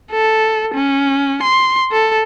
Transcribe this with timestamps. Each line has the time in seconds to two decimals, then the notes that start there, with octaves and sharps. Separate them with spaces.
0.11 A4
0.74 C#4
1.43 C6
1.92 A4